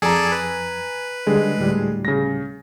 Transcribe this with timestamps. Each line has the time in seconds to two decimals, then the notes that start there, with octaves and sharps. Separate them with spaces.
0.02 F2 G#4 A4 D5 G#5 A#5
0.32 B4
1.27 D3 G3 G#3 G#4 A4
1.58 D2 A2 G3
2.05 C#3 A#6